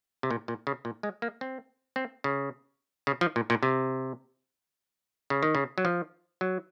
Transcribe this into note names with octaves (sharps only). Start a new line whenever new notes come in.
C3
A#2
A#2
C#3
A#2
G#3
A#3
C4
C4
C#3
C#3
F3
A#2
A#2
C3
C#3
D#3
C#3
F#3
F3
F#3